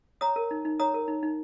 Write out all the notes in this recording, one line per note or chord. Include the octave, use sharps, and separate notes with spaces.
C#5 A#5 D#6
A#4
D#4
D#4
C#5 A#5 D#6
A#4
D#4
D#4